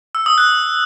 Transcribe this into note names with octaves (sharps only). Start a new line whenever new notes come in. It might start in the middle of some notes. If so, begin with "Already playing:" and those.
E6
D#6
F#6